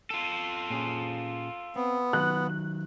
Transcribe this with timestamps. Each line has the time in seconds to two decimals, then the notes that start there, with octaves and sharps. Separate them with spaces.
0.10 F4 A4
0.70 A#2 C#4 G#4
1.76 B3 C4
2.13 D#3 F#3 F#6